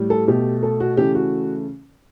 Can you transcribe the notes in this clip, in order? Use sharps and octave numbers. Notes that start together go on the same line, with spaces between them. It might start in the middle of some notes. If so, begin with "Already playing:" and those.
Already playing: A2 G3
A4
B2 A3 G4
A4
F#4
C#3 E3 A3 G4
F#4